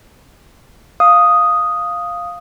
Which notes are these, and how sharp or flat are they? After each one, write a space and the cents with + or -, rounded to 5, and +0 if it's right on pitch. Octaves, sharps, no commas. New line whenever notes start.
F5 +0 D#6 +0